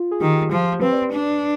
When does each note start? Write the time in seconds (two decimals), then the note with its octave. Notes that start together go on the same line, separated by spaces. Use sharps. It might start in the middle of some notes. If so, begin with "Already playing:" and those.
Already playing: F4
0.11 G#4
0.21 D#3 G4
0.51 F3
0.81 C4 B4
0.92 D5
1.02 B4
1.12 D4